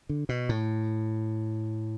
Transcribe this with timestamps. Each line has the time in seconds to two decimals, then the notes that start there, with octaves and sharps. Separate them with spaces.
0.09 D3
0.29 B2
0.49 A2